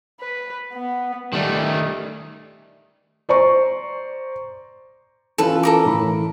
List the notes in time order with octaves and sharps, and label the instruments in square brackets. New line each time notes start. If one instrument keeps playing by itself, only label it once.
[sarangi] B4
B3
[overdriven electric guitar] D#3 A3 [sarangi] G3
[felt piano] C5 D5 A#5 C#6
[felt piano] E3 C#4 F4 [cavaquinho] A4 B4
[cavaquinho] A4 A#4 D6
[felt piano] A2 E3 B5